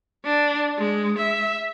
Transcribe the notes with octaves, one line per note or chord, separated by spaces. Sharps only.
D4
G#3
E5